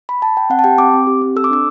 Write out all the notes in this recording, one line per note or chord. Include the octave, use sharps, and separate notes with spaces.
B5
A5
G5
C4 F#5
A5
G4 G5
C4 D6
C4
G4
C4
A4 E6
D6
D4 E6